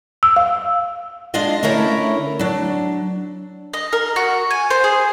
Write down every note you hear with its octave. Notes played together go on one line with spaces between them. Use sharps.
E6
F5
G#3 A#3 D4 F4 D#5 F5
D3 A3 C#4 E4 A#4 C#5
F#3 D4
D#5
A#4
F#4
G#5
C5
G#4